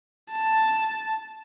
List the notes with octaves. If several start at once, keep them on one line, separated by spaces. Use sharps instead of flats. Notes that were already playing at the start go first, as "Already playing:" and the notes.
A5